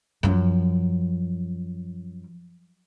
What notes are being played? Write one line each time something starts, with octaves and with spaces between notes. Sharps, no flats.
F#2 F3